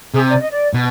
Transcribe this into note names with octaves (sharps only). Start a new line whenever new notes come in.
C3 G#4
D5
D#5
D5
B2